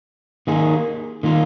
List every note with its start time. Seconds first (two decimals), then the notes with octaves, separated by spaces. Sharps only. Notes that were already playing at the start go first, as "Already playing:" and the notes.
0.47 D#3 A#3 D#4 G#4
1.23 D#3 A#3 F4